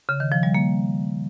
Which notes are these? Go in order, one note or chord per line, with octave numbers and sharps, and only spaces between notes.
C#3
D#3
F3
G3
A#3